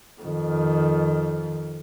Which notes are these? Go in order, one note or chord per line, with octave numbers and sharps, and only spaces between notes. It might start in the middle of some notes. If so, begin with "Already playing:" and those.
F2 D#3